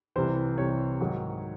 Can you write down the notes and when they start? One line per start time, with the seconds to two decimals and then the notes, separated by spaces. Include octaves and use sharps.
0.16 C2 C3 E3 C5
0.58 C2 C3 E3 C#5
1.00 G#2 D#3 F#3